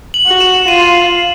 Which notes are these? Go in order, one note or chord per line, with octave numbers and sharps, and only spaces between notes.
F#7
F#4
E7
F4 D#7